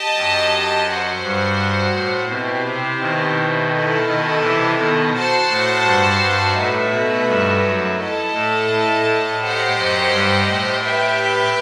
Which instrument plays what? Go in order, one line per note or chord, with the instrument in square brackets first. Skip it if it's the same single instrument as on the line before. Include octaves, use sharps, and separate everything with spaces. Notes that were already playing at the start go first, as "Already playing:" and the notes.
Already playing: [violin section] G4 D#5 A5
[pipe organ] F#2
[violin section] F#4 C5 F#5
[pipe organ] G2
A2
[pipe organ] B2 [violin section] C4 E4 G4 C5
[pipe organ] C3
B2 D#3
[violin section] E4 A4 D#5
[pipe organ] B2 D#3
C3 E3
B2 D#3
[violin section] F#4 C5 F#5 A5
[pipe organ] A2
G2
G2
[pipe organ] A2 [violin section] A3 D#4 F#4 B4 E5
[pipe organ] B2
G2
F#2
[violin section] E4 A4 D#5 A5
[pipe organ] A2
A2
A2
[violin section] G4 C5 D#5 F#5
[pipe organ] F#2
G2
A2
[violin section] G4 B4 E5 G5